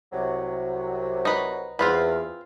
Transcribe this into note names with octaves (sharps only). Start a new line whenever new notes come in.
C2 C3 F#3
D#4 B4
E2 C4 F4 B4